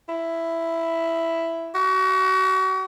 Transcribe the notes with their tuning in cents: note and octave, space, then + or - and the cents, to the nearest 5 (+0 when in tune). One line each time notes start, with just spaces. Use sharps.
E4 +5
F#4 +35